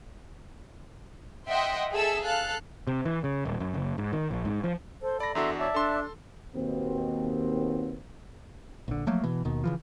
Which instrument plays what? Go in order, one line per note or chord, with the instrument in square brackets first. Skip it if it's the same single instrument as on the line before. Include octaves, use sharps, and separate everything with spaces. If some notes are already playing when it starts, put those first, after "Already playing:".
[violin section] D#5 E5 F#5 G5 C6
G#4 A4 E5 E6
A4 F5 F#6
[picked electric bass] C3
E3
C#3
D#1
F#2
F#1
G#2
D#3
A#1
G#2
F3
[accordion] A4 [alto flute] C5
[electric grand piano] D5 A#6 [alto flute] B5
[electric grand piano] E2 D4 F#4 [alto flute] A4 [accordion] E5 A#5 C6
[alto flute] C#5 [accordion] D5 E5 A5
[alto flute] D4 [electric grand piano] A4 C6
[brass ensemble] D#2 B2 C4
[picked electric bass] A#1 D3
F3 F#3 A3 A#3
B2 E3
D#2 B2 D#3
C#3 E3 F3